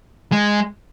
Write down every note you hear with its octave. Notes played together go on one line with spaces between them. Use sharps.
G#3